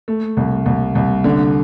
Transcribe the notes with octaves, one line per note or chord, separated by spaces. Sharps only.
A3
C2
C2
C2
D3